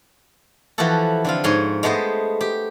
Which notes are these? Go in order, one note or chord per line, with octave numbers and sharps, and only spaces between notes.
E3 F3 E4 F#4 G4 A4
D3 C4 F4
G#2 C#5 G#5 C6
G#3 A3 B3 C5 D#5
G4